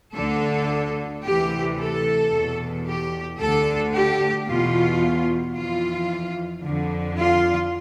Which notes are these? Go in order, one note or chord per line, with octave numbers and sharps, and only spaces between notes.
D2 D3 A4
D2 C3 E3 G4
A4
E2 B2
G4
D2 D3 A4
G4
E2 B2 F4
F2 E3 F4
F2 D3
F4